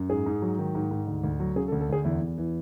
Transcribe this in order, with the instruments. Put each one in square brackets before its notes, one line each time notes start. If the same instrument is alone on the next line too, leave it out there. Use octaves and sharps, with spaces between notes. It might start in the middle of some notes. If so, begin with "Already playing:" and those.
Already playing: [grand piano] F#2
G#2 G#4
G#2
F#3
D#3
G#2
G#2
D2
D2
F#3
C#3 G#4
A4
D2
A4
D2 G#4
E2 E4
E2
E3